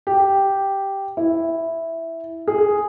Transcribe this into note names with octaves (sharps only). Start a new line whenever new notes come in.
G4
E4
G#4